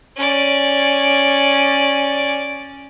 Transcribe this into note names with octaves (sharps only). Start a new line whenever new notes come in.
C#4 D5